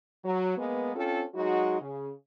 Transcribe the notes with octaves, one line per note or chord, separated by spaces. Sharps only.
F#3
G#3 A#3 B3
C4 C#4 F4 A4
F#3 G#3 D#4 F#4
C#3